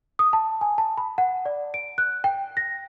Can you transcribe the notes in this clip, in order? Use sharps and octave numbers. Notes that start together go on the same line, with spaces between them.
D#6
A5
G#5
A5
B5
F#5
D5
D7
F#6
G5
A#6